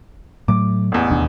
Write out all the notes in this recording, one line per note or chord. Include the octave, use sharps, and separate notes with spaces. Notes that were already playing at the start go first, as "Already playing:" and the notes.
A2 F#3 A3 D6
A1 E2
E1 D#2 D4